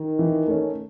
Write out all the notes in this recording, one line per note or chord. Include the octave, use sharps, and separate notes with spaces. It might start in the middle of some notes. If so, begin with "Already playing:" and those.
Already playing: D#3
E3
A3 C#4